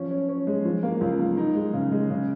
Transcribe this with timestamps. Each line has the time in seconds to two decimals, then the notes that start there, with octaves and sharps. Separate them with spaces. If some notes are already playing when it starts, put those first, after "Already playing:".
Already playing: F3 C#4
0.11 C#4
0.29 C#4
0.47 G#3
0.65 F3
0.83 A#3
1.01 C#2
1.19 A#3
1.37 D#4
1.55 G#3
1.74 C#3
1.92 G#3
2.10 C#3